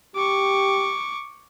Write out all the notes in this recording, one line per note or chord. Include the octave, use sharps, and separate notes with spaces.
G4 C#6 D6